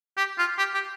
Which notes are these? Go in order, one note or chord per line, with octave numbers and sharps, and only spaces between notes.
G4
F4
G4
G4